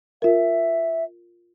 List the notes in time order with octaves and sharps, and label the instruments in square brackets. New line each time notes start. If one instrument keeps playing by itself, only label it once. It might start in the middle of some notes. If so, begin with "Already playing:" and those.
[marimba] F4 A#4 [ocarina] E5